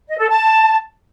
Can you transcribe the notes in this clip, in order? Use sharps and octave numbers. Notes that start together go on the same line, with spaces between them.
D#5
A4
A5